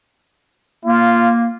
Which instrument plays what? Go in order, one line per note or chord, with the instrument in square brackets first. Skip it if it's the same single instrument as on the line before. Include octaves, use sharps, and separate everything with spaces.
[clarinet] A#3 [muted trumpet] F4